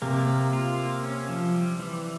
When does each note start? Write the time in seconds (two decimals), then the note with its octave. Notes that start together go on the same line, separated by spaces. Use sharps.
0.02 C3 A#3
0.27 A#3
0.53 F4
0.78 A#3
1.04 C#4
1.29 F3
1.54 G3
1.79 E3